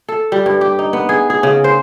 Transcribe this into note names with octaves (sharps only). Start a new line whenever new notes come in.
A4
G3
G2
G4
D#4
B3
G#4
G#4
C#3
C5